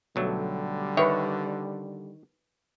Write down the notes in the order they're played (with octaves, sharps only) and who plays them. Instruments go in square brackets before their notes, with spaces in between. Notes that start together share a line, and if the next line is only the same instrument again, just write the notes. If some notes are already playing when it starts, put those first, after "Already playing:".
[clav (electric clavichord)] B1 F#3 A3 [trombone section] D3 G3
[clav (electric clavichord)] D#3 C#5 G5 [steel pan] B4 E5